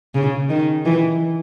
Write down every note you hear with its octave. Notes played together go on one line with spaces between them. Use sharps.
C#3
D#3
E3